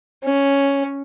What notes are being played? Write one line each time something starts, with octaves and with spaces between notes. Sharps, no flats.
C#4